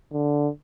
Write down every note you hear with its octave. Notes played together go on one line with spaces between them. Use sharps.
D3